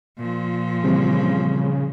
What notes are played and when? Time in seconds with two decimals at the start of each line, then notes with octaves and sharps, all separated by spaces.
0.18 A#2 F3
0.84 C#3 E3 G3 C4